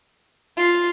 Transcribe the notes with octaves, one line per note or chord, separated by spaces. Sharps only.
F4